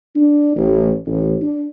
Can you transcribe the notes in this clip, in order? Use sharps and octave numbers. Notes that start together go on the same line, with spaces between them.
D4
A1
A1
D4